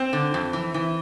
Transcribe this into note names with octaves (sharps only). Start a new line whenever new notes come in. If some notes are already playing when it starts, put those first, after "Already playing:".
Already playing: C4
D3
F2
E3
E3